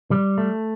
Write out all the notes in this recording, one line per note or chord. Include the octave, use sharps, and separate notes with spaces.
G3
A3